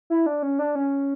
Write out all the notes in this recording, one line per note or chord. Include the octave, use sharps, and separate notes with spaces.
E4
D4
C#4
D4
C#4